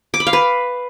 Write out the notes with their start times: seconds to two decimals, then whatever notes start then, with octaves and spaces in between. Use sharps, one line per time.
0.14 D6
0.20 B5
0.27 F5
0.33 B4